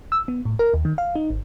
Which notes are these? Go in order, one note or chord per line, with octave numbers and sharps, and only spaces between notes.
E6
B3
A2
A#4
D#2
D#3
F5
D#4
G#1